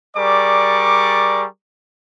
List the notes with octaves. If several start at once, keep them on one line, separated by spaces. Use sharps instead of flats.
G3 G#4 A#4 D5 C#6 D6